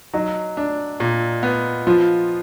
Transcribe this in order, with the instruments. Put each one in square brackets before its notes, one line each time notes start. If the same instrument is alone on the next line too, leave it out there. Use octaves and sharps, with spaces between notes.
[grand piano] F#3 [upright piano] D#4
[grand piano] D4
A#2
B3
[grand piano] F3 [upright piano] F4